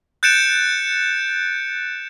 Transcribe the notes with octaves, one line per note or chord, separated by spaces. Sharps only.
F#6 G6 A6 C#7 D7 E7